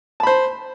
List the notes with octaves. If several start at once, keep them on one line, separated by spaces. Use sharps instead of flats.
C5 A5 B5